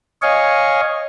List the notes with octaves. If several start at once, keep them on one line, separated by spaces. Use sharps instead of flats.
C#5 D#5 F5 G#5 C#6